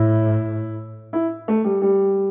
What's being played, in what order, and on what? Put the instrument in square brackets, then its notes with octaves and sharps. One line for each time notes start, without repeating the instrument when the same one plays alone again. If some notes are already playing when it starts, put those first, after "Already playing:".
Already playing: [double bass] A2 [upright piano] E4
[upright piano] E4
A3
G3
G3